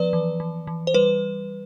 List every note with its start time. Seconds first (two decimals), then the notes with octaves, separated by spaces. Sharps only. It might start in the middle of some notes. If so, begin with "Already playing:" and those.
Already playing: F3 B3 B4 D5
0.13 E3
0.40 E3
0.67 E3
0.87 C5
0.94 G3 B4